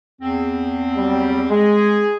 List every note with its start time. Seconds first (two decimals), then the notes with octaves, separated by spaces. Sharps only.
0.21 E2 C4
0.96 F#3 G3
1.50 G#3 G#4